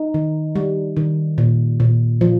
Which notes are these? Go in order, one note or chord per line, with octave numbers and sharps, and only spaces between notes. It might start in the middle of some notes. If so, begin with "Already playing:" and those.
Already playing: D#4
D#3
G3
D#3
A#2
A#2
F3